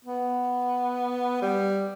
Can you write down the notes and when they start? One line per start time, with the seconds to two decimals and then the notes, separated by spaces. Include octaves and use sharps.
0.05 B3
1.42 G3